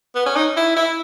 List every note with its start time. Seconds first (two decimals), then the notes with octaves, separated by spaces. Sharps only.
0.15 B3
0.26 C#4
0.36 D#4
0.57 E4
0.76 E4